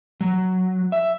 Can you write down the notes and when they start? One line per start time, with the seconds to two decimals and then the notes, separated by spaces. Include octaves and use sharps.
0.21 F#3
0.92 E5